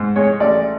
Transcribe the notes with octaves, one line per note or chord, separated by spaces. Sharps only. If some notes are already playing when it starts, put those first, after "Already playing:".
Already playing: G#2
G#3 C#5
A1 D5